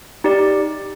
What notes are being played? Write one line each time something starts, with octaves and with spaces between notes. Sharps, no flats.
D#4 G4 D5